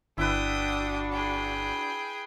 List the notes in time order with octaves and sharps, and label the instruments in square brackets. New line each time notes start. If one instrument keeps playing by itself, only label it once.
[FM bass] G1 [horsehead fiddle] D4 F#4 [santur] E4 B4 [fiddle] G5 D#6
[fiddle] G#4 G5